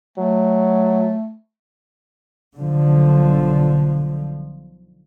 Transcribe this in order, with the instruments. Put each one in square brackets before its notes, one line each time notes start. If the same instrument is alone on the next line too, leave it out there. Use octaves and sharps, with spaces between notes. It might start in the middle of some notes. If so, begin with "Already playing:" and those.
[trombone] F#3 [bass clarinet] A3
[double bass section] B1 D3 F3